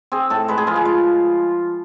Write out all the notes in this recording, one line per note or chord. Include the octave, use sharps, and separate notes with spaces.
C4 G#4
A2 A4
G#3 B4
G#4
F3 F4
G#4
G#3